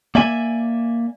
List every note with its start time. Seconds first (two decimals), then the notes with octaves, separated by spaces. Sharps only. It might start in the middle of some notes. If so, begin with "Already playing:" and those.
0.15 A#3 D5 E5 G#5